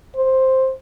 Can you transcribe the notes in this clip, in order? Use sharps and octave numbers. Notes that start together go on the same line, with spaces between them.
C5